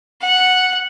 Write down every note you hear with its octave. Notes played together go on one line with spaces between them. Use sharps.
F#5